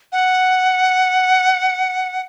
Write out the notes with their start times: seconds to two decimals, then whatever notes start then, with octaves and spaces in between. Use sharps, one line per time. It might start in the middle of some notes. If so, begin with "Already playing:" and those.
0.12 F#5